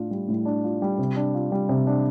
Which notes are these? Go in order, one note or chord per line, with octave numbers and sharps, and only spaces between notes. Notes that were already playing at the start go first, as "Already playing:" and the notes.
Already playing: A2 D4 F4
G3
A2
D4
F4
G3
C3
D4
F4
G3
C3
D4